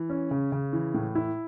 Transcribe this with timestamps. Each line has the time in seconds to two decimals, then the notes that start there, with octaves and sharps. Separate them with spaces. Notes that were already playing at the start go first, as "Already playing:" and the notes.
Already playing: E3
0.10 C#4
0.31 C#3
0.52 C#3
0.73 E3
0.94 A2
1.15 E4